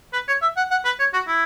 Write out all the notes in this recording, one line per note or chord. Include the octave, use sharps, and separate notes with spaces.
B4
C#5
E5
F#5
F#5
B4
C#5
F#4
E4